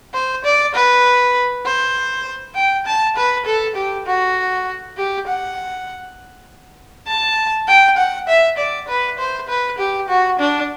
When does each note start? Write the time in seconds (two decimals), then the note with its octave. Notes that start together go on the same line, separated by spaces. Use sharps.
0.14 C5
0.45 D5
0.75 B4
1.65 C5
2.55 G5
2.86 A5
3.16 B4
3.46 A4
3.75 G4
4.06 F#4
4.97 G4
5.27 F#5
7.07 A5
7.68 G5
7.97 F#5
8.28 E5
8.58 D5
8.88 B4
9.19 C5
9.49 B4
9.78 G4
10.09 F#4
10.39 D4